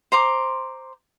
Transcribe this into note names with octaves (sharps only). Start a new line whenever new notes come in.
C5 A#5 C6 D6